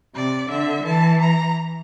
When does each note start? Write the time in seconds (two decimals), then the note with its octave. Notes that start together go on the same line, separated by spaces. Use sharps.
0.15 C3 D5
0.50 D3 E5
0.85 E3 A5
1.20 A#5